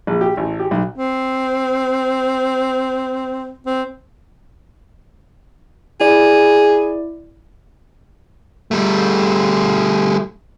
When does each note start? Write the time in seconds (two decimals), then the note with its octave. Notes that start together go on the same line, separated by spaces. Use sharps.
0.07 A#1
0.21 G4
0.37 A1
0.59 G4
0.71 B1
0.96 C4
3.66 C4
6.00 E4 G#4 D5
8.71 G3 A3